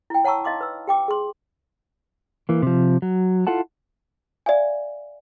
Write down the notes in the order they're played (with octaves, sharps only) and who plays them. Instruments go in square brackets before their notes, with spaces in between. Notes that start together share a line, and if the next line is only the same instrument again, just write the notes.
[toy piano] E4 G5
C#5 F#5 A5 A#5 C#6 E6
D#4 D#5 F5 C6 D6
B4 E6
G4 G5 D6
G#4 C6
[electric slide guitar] E3 A#3
C3 F3
F#3
E4 F4 A4 F#5 A5
[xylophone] D5 E5 F5 G#5